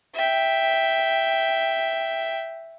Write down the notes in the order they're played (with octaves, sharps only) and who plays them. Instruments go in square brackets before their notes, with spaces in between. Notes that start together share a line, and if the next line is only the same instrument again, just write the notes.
[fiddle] E5 G5